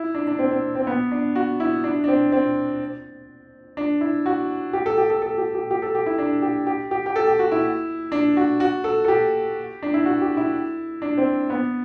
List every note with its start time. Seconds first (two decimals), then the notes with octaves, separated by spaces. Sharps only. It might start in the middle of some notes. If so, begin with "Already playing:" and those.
Already playing: E4
0.15 D4
0.27 D4
0.39 C4
0.51 C4
0.75 C4
0.87 B3
1.11 D4
1.35 F#4
1.60 E4
1.84 D4
2.04 D4
2.08 C4
2.32 C4
3.77 D4
4.01 E4
4.26 F#4
4.73 G4
4.86 A4
4.98 G4
5.10 A4
5.22 A4
5.38 G4
5.55 G4
5.71 G4
5.82 A4
5.95 G4
6.06 E4
6.18 D4
6.42 G4
6.67 G4
6.91 G4
7.06 G4
7.16 A4
7.27 G4
7.39 F#4
7.52 E4
8.12 D4
8.37 F#4
8.60 F#4
8.84 A4
9.05 A4
9.08 G4
9.83 D4
9.94 E4
10.06 F#4
10.21 G4
10.37 E4
11.02 D4
11.18 C4
11.50 B3